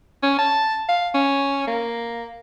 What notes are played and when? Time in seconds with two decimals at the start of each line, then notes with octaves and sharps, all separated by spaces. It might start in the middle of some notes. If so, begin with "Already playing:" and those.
0.23 C#4
0.39 A5
0.89 F5
1.14 C#4
1.67 A#3